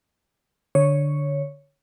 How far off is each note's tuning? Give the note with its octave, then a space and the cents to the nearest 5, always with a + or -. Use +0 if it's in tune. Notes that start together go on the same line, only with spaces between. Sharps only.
D3 +0 C#5 +0